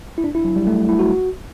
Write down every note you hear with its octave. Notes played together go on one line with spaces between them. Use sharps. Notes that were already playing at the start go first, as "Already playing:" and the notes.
E4
D4
E4
F#3
G3
A3
E4
F#4